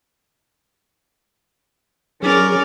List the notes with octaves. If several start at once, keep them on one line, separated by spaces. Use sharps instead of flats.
F#3 C#4 G#4 A#4 D5